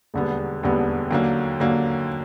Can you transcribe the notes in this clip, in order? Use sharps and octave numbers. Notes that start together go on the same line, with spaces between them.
E1 D#2 D3 G3 B3
E1 D#2 D3 G3 B3
D#2 D3 F#3 A#3
D#2 D3 F#3 A#3